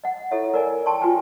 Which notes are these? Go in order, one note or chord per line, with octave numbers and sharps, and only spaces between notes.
D#5 F#5
E4 G4 A4 C#5 E5
A#4 D5 G#5
G5 A5 C6 C#6
F4 F#4 B4 G5 G#5